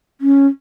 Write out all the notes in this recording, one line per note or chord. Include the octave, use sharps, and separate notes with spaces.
C#4